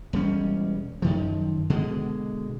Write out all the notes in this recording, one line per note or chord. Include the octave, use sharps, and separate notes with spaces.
E1 G3 C#4
F#2 D#3 F3
B2 D3 G#3